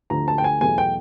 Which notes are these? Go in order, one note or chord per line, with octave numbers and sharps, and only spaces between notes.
D2 D3 F3 A#5
A5
G5
G#5
E2 B2 F#3 A3 G#5
G5